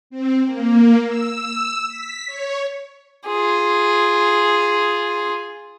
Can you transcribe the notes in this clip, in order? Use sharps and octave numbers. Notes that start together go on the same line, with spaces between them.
C4
A#3
E6
B6
C#5
F4 G#4